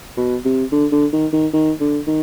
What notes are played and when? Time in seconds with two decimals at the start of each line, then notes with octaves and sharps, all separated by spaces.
0.17 B2
0.45 C3
0.72 D3
0.92 D3
1.13 D#3
1.33 D#3
1.53 D#3
1.80 D3
2.07 D#3